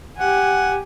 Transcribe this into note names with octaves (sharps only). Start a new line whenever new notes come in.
G4 F#5 G#5